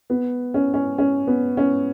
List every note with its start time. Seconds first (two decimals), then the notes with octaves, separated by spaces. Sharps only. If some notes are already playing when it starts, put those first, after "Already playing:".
0.10 B3
0.54 C#4
0.74 C#4
0.98 C#4
1.27 B3
1.57 C#4